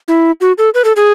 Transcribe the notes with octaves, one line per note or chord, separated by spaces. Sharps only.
E4
F#4
A4
B4
A4
G#4